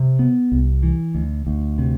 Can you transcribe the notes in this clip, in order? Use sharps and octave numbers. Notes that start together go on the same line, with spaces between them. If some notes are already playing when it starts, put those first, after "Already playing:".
Already playing: C3
B3
C2
E3
D2
D2
C3